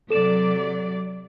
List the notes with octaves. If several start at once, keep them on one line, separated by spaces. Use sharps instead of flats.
C3 F#3 A4 D5 E7